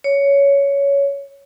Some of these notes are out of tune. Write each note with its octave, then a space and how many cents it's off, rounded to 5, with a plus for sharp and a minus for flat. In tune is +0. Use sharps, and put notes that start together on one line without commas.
C#5 +15